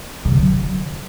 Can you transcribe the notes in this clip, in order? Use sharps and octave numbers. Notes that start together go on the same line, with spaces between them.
C#3
D3
F#3